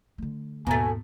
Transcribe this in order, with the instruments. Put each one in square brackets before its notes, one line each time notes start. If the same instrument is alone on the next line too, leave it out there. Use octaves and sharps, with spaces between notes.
[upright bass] D3 A3
[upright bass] D#2 G#2 [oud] B2 A3 [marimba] B3 A#5 A6 [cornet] G#5